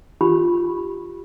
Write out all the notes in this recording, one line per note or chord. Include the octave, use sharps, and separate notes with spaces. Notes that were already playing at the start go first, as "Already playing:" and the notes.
F4 G4 B5